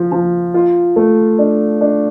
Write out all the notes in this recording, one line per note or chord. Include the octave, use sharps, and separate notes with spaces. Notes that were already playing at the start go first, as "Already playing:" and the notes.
Already playing: F3
F3
F4
A3
D4
D4